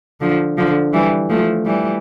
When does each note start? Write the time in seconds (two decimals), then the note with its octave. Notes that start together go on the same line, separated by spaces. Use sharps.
0.21 D3 F3
0.58 D3 F3
0.93 E3 G3
1.29 F3 A3
1.66 E3 G3